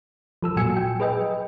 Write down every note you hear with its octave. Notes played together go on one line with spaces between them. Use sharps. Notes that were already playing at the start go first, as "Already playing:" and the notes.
F3 A4 E6
A#2 F#3 F#4 G#5 E6 C#7
G5
G#4 B4 D#5 G5